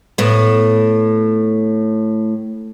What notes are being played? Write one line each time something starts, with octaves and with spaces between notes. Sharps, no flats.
A2 B3